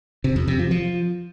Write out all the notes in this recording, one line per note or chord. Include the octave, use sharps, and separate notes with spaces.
C3
F2
C3
F3
F3